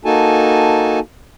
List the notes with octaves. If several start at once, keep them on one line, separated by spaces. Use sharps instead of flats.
A#3 D#4 F#4 A4 G#5 A5